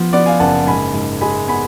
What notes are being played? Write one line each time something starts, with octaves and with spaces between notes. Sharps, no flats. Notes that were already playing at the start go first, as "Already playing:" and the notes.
Already playing: F3 B3
B3 D5 F#5
F5 G#5
F#1 F#5 A5
G#2 G#5 B5
G#2
G#3 G#5 B5
B3 G#5 B5